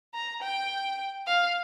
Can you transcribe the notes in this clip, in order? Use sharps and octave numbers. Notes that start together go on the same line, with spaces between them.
A#5
G5
F5